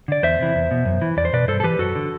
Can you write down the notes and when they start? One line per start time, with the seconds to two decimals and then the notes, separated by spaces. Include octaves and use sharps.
0.08 D3 D5
0.23 E2 C5 E5
0.39 C3 E3
0.55 E2
0.71 B2
0.85 F#2
1.02 E3
1.17 E2 D5
1.25 C5
1.33 B2 B4 D5
1.48 G2 A4 C5
1.60 A4
1.64 E3 G4 B4
1.79 F#2 F#4 A4
1.95 D3